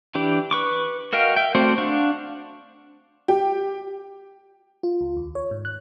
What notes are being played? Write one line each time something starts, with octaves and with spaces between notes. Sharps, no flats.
E3 D4 G4
B4 C#6 D6
F#4 A#4 D#5 F5 G5
E5 G5
A3 C4 F#4 C5 D5
D4 F5 F#5 C#6
G4
F4
C#2
D#2
C#5
G#2
F#6